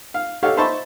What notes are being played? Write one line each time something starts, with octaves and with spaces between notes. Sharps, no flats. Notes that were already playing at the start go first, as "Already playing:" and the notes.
F5
D#4 G4 A4 C#5 F5 F#5
D#4 C5 E5 A5 B5 C#6